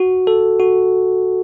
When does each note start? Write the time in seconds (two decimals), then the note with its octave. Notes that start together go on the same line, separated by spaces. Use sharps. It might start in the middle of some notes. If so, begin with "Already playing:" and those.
Already playing: F#4
0.27 A4
0.60 F#4